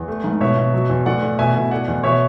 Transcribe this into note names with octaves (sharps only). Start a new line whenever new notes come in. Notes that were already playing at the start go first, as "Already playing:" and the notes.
Already playing: E2
A3
G#2
B2 C#5 E5
B2
F#3
E2
A2 D5 F#5
A2
B2 E5 G#5
B2
A3 D5 F#5
E2
B2 C#5 E5